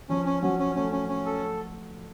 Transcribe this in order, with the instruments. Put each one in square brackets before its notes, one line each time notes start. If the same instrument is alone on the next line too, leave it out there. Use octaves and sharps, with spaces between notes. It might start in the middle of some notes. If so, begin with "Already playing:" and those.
[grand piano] F3 [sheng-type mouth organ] C#4
[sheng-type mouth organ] C#4
[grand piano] F#3 [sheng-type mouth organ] C#4
[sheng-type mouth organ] C#4
[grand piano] A3 [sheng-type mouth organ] C#4
[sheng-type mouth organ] C#4
C#4
A4